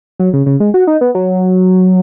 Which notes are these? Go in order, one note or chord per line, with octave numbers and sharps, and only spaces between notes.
F#3
C#3
C#3
G#3
F#4
D#4
B3
F#3